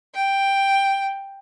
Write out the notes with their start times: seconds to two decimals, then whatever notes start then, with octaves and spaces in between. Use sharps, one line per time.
0.14 G5